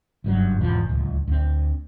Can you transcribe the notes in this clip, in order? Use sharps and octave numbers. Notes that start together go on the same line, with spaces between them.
F#1 G2 F#3
G#1 E2 B2 F3
D1 C#2
D2 C4